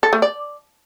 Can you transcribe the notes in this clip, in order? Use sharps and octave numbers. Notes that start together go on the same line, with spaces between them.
A4
A3
D5